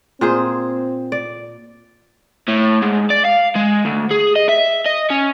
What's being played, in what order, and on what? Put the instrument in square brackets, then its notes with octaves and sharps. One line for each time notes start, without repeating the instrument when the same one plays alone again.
[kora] A#2 G#4 C5 [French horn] C4
[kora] D5
[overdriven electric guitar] A2
G#2
D5
F5
G#3
D2
G#4
D#5
E5
D#5
C#4